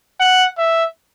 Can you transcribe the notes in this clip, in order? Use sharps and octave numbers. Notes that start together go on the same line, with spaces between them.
F#5
E5